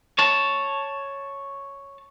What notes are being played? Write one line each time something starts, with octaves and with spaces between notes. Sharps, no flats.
C#5 A5